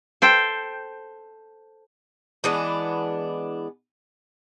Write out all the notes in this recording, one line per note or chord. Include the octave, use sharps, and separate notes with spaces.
A4 C5 G5
E3 G#3 B3 D4